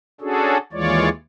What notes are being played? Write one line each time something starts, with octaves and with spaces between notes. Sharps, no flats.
C#4 D4 F#4 G#4 A4
D#2 E3 G#3 F4 C#5 D5